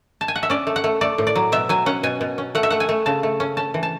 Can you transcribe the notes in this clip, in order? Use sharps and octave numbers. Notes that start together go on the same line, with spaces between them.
A5
G#5
F#5
E5
C#4 D5
A3
F#5
A3
A3 D5
A2
D5
F#3
B2 E5
F#3 G#5
C#4 F#5
B2 G#5
B2
C#4
A3 F#5
E5
A3 F#5
G#5
A3
C#3 A5
A3
C#4
C#4 A5
E3
A5